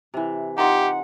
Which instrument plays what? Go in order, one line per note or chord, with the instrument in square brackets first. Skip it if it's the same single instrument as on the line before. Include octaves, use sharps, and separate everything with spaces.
[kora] C3 E3
[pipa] D#4 F4 [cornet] G4 [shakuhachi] F#5